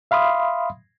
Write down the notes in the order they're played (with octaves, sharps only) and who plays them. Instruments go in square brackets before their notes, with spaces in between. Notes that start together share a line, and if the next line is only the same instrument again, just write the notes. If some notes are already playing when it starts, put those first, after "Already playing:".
[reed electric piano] E5 F5 B5 C6 D#6